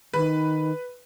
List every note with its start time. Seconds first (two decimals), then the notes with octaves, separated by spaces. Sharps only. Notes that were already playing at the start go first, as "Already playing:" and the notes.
0.14 D#3 B4